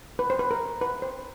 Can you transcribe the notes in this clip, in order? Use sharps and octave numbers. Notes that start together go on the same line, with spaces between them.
B4
C5
B4
A#4
B4
C5